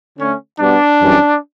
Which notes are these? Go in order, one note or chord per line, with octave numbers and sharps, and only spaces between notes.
D3 A3 C#4
B2 G3 B3 D4
F#2 E3 G3 C#4